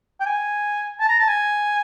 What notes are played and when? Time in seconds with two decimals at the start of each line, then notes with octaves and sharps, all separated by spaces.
0.20 G5
0.26 G#5
1.00 A5
1.09 A#5
1.19 A5
1.28 G#5